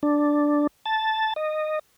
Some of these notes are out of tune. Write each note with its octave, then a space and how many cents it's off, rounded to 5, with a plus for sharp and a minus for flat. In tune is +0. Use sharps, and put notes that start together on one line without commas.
D4 +0
A5 -5
D#5 -15